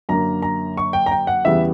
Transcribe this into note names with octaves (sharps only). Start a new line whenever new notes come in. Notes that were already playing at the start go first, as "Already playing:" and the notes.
F#2 D3 A#3 A#5
A#5
C#6
G5
A#5
G5
F#5
E2 C#3 E3 G3 B3 E5